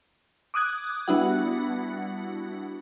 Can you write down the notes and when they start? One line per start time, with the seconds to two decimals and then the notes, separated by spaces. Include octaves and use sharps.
0.54 D6 D#6 F#6 G#6
1.08 G3 B3 D4 E4 F#4 F#5